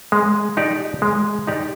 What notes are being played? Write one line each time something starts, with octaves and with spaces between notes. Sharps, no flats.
G#3
D#4 G4 D5
G#3
D#4 G4 D5